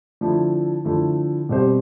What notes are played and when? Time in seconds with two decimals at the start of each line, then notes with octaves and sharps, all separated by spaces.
0.21 D3 F3 A3 E4
0.84 D3 F3 A3 E4
1.49 B2 G3 C4 G4 C5